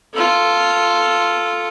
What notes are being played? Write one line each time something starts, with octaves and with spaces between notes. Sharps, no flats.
F4 A4